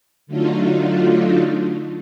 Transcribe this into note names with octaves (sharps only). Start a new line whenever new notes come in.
D3 F#3 A3 D4 D#4 F4